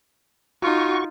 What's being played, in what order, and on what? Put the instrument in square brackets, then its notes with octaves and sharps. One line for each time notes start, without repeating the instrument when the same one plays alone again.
[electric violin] D#4 F4 [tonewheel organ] F#4 C#6